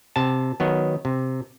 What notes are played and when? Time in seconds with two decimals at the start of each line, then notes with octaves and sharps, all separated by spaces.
0.16 C3 A5
0.60 D#3 F#3 B3
1.05 C3